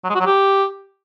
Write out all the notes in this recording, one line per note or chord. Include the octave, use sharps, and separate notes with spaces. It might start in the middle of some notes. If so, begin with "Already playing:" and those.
F#3
G#3
F#4
F#3
G4